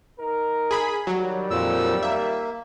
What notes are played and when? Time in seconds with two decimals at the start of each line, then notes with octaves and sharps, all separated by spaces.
0.19 D#4 A#4
0.71 G#4 B5
1.07 D#3 F#3 G3
1.51 F2 A#2 E6
2.03 A#3 E5